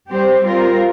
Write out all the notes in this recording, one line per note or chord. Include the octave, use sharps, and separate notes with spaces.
G3 C4 G4 C5
G3 C4 F4 A#4